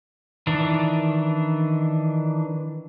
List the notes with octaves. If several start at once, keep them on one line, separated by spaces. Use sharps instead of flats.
D#3 E3 D4